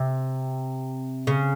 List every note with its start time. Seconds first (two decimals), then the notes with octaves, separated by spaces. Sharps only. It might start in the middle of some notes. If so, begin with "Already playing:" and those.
Already playing: C3
1.27 C#3